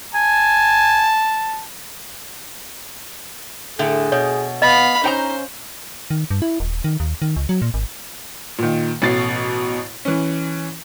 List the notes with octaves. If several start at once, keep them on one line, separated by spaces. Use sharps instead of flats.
G#5 A5
A2 D3 A3 G#4
B2 C#5
B3 D#5 F5 B5
C#4 D#4 C5 G5 A#5
D#3
G2
E4
D#1
D#3
D#2
D#3
C#2
F#3
A#2
G#1
A#2 D#3
A1 B2 A6 C7
E3 C#4